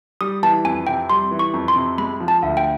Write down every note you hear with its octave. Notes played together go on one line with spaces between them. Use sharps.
G3 D#6
E3 A5
F2 G#5
C3 G5
G3 C6
E3
C#6
F2
C6
C3
G#3 B5
F3
A5
D2
G5